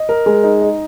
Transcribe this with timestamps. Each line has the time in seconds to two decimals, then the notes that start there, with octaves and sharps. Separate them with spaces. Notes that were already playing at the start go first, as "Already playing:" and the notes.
Already playing: D#5
0.09 A#4
0.26 G#3
0.44 D#4
0.61 D#5